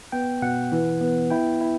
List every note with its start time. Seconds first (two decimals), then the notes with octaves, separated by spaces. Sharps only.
0.12 B3 G5
0.42 B2 F#5
0.72 E3
1.01 B3
1.30 E4 G5
1.61 E4